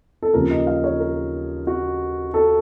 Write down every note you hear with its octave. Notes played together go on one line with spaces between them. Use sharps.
A4
D#2 C#3 F3 A#3 A#4
D#5
F5
C#5
A#4
F#4
A4